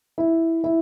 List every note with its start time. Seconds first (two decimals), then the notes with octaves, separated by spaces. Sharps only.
0.18 E4
0.64 E4